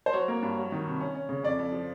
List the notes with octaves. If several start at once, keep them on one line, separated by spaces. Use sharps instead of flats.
C5
F#3 C#5
A#3
G2
F#3
D#3
C3
C#4
C#4
C#3
F2 D5
F2
F3